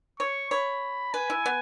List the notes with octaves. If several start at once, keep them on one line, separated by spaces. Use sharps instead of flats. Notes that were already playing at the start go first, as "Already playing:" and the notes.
C#5 C#6
C#5 B5
B4 G#5
E4
B3